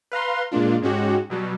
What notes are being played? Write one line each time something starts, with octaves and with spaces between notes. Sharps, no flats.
B4 F5 A#5 C6
A#2 G#3 A#3 D4 F4
G#2 G#3 C#4 D#4 F#4 G4
B2 F#3 G3